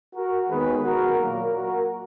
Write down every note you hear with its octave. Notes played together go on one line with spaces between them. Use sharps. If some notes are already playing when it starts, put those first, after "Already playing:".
F#4 A#4
D#2 D#3 G#3 B3 G#4 B4
F#4 A#4
A#2 F#3 A#3 F#4 A#4
F#4 A#4